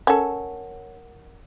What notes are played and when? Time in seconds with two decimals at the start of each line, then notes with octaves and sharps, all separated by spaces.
0.07 C#4 A4 A#4 F#5